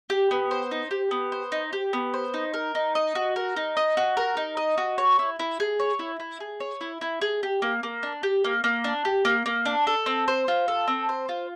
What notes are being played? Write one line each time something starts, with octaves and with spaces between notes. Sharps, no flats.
G4
B3
C5
D#4
G4
B3
C5
D#4
G4
B3
C5
D#4
A#4
D#4
D#5
F#4
A#4
D#4
D#5
F#4
A#4
D#4
D#5
F#4
C#5
E4
E4
G#4
C#5
E4
E4
G#4
C#5
E4
E4
G#4
G4
A#3
A#3
D4
G4
A#3
A#3
D4
G4
A#3
A#3
D4
A4
C4
C5
F4
A4
C4
C5
F4